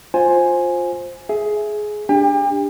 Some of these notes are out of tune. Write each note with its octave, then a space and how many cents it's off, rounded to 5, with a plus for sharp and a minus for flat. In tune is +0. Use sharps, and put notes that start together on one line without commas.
F4 +15 C5 +10 G#5 +0
G#4 +15 E5 +0
D4 +0 G4 +25 G5 +45